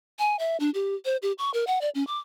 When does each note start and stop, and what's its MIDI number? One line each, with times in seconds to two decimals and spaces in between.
0.19 0.36 80
0.39 0.57 76
0.60 0.70 62
0.74 0.95 67
1.05 1.17 72
1.22 1.32 67
1.38 1.51 85
1.54 1.64 70
1.67 1.79 78
1.81 1.90 74
1.95 2.06 61
2.07 2.18 86